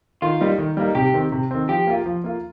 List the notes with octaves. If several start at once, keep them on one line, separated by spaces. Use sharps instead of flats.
D#3 F4
G3 A#3 D#4
D#3
G3 A#3 D#4
C3 G4
D#3 C4
C3
D#3 C4
F3 G4
A#3 F4
F3
A#3 F4